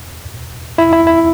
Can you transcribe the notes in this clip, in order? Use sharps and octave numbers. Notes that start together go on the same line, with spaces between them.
E4
E4
E4